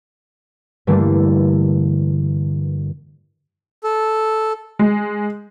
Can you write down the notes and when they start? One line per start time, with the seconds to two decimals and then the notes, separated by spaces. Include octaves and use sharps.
0.87 G2 D3 E3 A3 A#3 D4
3.84 A4
4.79 G#3